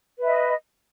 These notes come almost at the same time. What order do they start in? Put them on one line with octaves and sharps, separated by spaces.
B4 E5 D#5